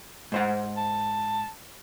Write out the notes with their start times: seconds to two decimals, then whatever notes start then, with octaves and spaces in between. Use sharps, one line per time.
0.32 G#2 C5 F#5
0.77 A5